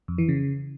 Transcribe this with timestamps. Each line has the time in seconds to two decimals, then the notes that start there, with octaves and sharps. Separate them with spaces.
0.08 F2
0.18 E3
0.29 C#3